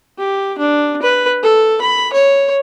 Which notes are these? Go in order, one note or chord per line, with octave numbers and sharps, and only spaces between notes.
G4
D4
B4
A4
B5
C#5